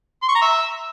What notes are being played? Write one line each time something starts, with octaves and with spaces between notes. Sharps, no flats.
C6
C#6
A#5
E5